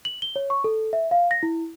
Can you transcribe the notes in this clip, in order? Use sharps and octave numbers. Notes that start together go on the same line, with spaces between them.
F#7
G7
C#5
C#6
A4
E5
F5
A#6
E4